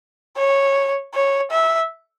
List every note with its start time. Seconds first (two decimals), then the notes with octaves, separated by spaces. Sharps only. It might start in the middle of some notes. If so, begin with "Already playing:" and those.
0.37 C#5
1.14 C#5
1.51 E5